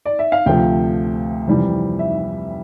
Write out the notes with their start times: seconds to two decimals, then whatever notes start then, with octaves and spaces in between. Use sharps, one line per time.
0.05 D5
0.19 E5
0.32 F5
0.46 D2 C3 F3 A3 G5
1.47 F2 C3 E3 G3
1.99 E5